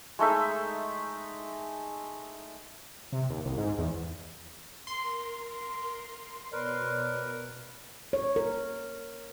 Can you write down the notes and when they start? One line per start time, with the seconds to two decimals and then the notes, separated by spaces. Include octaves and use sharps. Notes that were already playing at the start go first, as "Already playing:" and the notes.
0.19 G#3 A3 D#4 E5
3.13 C3
3.30 D#2
3.45 C2
3.58 G#2
3.79 E2
4.87 A#4 C6
6.53 B2 A#4 B4 C#5 D5
8.13 C#5
8.36 A#4